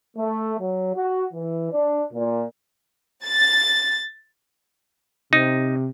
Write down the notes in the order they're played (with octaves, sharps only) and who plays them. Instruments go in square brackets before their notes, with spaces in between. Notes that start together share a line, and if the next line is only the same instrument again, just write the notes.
[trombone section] A3
F#3
F#4
E3
D4
A#2
[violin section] A6
[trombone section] C3 [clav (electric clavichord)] D#4